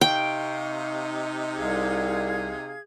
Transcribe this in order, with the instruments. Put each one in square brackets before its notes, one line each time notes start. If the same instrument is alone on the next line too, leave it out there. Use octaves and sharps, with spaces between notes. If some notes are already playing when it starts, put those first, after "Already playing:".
[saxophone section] C3 D#4 [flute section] F5 C#6 [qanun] G5
[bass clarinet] C2 [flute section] G#4 F5 G#6